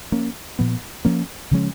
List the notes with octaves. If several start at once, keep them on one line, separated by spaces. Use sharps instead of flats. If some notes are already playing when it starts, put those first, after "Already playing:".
F3 A#3 C#4
A#2 F3 B3
F3 A#3 C#4
C#3 F3 G#3 C#4